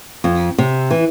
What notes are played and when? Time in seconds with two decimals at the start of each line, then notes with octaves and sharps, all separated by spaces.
0.24 F2
0.58 C3
0.91 E3